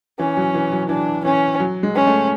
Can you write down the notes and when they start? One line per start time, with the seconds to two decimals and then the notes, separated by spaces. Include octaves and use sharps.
0.19 E3 C#4
0.37 F#3
0.55 E3
0.72 F#3
0.89 E3 D4
1.25 E3 C#4
1.60 F#3
1.83 G#3
1.96 C#4
2.07 A3